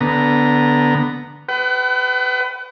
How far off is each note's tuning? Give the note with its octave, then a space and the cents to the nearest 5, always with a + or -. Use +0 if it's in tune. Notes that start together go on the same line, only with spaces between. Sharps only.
D3 -15 B3 +0 A#5 +0
B4 +25 F#5 +45